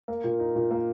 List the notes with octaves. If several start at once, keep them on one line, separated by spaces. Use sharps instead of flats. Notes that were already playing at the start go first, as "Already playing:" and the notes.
A#3
A#2
D#4
A#2
A#3